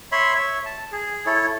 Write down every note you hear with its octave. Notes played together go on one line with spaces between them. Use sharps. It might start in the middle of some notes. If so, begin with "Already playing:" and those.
C#5 E5 B5 C6
C#5 E5
A5
G#4
E4 A4 C#5